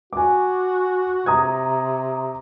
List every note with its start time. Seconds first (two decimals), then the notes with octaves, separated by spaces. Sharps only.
0.13 F#4 G#5 D6
1.26 C3 A#5 D#6 G#6